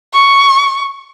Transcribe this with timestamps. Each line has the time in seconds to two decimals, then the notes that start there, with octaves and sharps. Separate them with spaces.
0.14 C#6